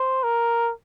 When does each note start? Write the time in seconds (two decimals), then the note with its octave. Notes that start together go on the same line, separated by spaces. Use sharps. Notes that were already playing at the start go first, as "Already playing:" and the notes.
Already playing: C5
0.24 A#4